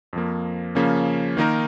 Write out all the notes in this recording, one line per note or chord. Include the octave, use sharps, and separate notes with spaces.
F2 F3 A#3
C#3 F3 A#3 C#4
D#3 A#3 D#4 A#4